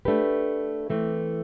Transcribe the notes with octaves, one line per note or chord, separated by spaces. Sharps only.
A3 D4 G4 B4
E3 A3 C4